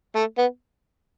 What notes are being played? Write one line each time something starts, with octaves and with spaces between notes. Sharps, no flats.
A3
B3